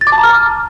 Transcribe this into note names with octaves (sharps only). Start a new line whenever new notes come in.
A6
D6
A5
A#5
F6